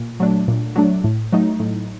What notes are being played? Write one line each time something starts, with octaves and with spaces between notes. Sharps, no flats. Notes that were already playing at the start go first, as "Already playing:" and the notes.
Already playing: A#2
F#3 A3 D4
A#2
F#3 A3 D4
A2
F#3 A3 D#4
A2